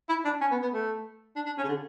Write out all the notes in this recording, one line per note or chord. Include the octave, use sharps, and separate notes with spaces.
E4
D4
C#4
B3
B3
A3
D4
D4
C#4
C#3
D3